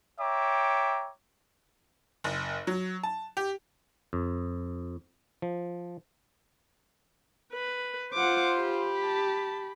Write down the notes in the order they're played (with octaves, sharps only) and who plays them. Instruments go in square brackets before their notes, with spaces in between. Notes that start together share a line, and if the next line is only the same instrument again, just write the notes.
[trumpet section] C#5 E5 G5 A#5 D6
[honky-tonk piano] F#1
F#3
A5
G4
[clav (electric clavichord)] F2
F3
[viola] B4
[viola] F4 C5 [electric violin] F#5 D6
[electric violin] G4 B5
[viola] A5